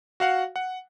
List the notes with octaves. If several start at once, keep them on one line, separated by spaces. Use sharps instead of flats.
F#4 F5 F#5
F#5